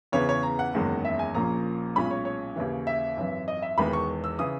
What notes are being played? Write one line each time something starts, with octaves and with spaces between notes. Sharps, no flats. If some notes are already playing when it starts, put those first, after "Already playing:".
E2 C#3 E3 B3 C#5
C#5
A#5
F#5
F#1 E2 D#3 G#3 C#4
E5
G#5
A#1 A#2 A#3 C#4 A#5
B1 A#2 G#3 C#4 B5
C#5
C#5
D#2 C#3 E3
E5
G#1 F#2 E3
D#5
E5
E1 E2 D#3 G#3 B3 B5
C#6
E6
C#3 E3 D#6